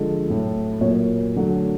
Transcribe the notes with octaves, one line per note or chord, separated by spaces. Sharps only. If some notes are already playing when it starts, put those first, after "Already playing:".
Already playing: D3 F3 G#3 A4
A2 F#3 A3
A#2 F#3 A#3 C#5
D3 F#3 A3